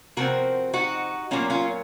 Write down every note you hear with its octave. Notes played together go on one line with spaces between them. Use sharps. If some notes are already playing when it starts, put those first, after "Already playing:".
C3 F3 C4 F#4 A#4
D#4 F#4
A#2 F#3 A#3 C#4 F4
C#4 F4